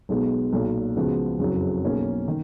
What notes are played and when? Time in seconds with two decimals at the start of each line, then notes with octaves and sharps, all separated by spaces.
0.09 B1 B2 G#3 B3
0.53 B1 A#2 F#3
0.96 C#2 C#3 F3 B3 F#4
1.39 F#1 F2 C#3 F#3
1.82 B1 B2 A#3 C#4 G#4
2.28 D#3